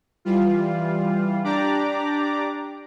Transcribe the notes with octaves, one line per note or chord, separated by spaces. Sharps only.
E3 G3 F4
D4 G4 D5 A#5 D6